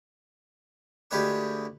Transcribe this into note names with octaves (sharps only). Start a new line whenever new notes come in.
D2 G#3 G4 B4 C#5 C#6